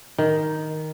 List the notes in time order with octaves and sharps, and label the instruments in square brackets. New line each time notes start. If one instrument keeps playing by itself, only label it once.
[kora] D#3